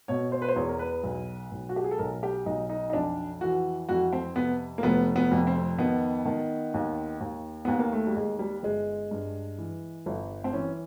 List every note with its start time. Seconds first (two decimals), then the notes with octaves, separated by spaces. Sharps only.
0.08 B2 C#5
0.32 C5
0.42 B4
0.48 C5
0.56 E2 C#5
0.69 A#4
0.79 B4
1.03 B1
1.51 B1
1.69 F#4
1.76 G4
1.84 G#4
1.91 A4
1.98 B1 A#4
2.23 G4
2.46 B1 D#4
2.69 D#4
2.90 D#4
2.93 F2 D4
3.41 E3 F#4
3.89 F2 F#4
4.13 C4
4.36 C3 B3
4.78 A#3
4.83 F1 B3
5.16 B3
5.31 F2
5.47 C4
5.79 D#3 B3
6.25 D#3
6.74 D#2
7.21 D#2
7.65 D#2 B3
7.79 A#3
7.92 A3
8.07 G3
8.16 D#2 G#3
8.39 G3
8.63 G1 G#3
9.11 G2
9.58 E3
10.06 G1
10.44 C4
10.53 E3 C#4